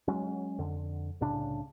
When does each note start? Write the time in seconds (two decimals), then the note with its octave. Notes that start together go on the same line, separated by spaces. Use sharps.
0.08 F#3 G#3 C#4
0.58 F2 D3
1.21 C2 A2 C#3 D4